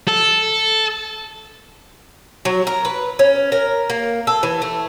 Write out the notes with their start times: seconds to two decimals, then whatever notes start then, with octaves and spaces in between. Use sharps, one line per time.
0.08 A4
2.45 F#3
2.67 A#4
2.85 B4
3.19 C#4
3.52 A#4
3.90 A#3
4.27 A4
4.43 E3
4.62 A3